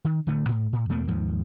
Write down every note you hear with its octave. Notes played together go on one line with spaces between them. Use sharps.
D#3
D1 D3 A3
G#2
A2
E2 B2 A3 A#3
D#2 G#2 F3